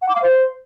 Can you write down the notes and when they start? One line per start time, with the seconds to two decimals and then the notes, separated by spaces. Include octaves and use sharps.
0.02 F#5
0.08 D6
0.15 F5
0.22 C5